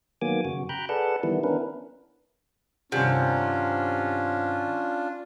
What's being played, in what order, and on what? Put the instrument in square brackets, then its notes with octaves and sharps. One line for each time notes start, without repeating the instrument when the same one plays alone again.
[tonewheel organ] D#3 F#3 A#3 B3 G#5 D6
F#2 C#3 F#4
G5 A#5 B5 F#6 G6
G#4 A4 B4 D5 F#5 A5
D#3 E3 G3 B3 E4
B3 C#4 D4 E4 A#4 B4
[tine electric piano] G2 D#3 F#5 [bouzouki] C3 [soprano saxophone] C#4 [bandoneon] D4 F4